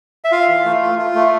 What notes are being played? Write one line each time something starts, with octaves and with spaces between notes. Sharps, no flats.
E5
F4 F5
E3
A3
F4
F4
A3